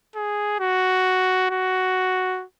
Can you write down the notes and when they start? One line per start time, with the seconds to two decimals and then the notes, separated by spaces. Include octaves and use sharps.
0.15 G#4
0.60 F#4
1.51 F#4